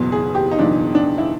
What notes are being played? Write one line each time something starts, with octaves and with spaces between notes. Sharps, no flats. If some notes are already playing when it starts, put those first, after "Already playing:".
Already playing: F#1 E2 B2
G#4
G4
D#4
F#1 E2 B2 D4
D4
E4